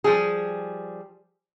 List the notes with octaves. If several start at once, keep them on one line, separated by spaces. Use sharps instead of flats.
F3 G3 G#4